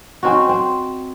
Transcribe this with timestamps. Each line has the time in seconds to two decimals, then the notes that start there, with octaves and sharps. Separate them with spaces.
0.23 C4 C#4 D#4 F#4
0.49 C4